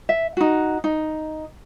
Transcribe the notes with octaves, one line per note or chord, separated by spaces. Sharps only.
E5
D#4 F#4
D#4